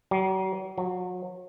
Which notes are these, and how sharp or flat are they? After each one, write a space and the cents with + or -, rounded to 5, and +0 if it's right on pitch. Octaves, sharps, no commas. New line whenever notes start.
F#3 +40
F#3 -35